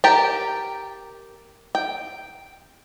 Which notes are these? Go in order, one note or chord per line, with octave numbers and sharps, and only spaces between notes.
G4 A#4 G5 A5
G5